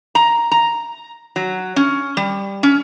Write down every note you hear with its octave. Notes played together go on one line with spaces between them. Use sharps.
A#5
A#5
F#3
C#4
G3
C#4